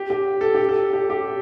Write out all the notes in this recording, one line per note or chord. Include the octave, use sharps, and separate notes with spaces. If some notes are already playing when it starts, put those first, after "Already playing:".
Already playing: G4
G4
A4
G4
A4
G4
G4